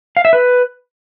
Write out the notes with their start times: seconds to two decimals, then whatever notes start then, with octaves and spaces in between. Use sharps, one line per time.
0.17 F5
0.25 E5
0.33 B4